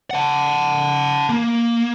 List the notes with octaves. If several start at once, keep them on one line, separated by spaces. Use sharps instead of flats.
F#5 A5
A#3